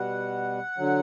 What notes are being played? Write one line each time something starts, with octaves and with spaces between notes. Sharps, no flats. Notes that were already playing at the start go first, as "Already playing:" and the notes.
Already playing: B2 G3 F#5
D3 F#3